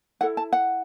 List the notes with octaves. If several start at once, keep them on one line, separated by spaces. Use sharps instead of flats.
E4 A4 F#5
A5
F#5